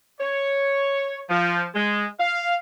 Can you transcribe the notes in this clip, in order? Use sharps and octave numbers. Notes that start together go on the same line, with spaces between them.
C#5
F3
G#3
F5